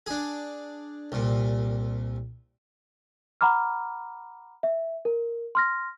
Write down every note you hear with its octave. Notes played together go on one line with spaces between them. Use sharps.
D4 G#4
C2 A#2
F#5 A#5 B5 D6 F6
E5
A#4
C6 F6 A#6